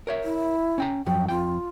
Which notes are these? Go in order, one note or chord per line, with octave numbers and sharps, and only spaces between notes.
A#4 C#5 E5
E4
C#4 G5 A#5
F#2 F3 F#3 G5
F2 F4 G5